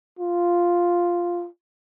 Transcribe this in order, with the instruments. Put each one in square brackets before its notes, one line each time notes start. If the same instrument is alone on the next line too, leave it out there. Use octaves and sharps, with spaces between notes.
[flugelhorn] F4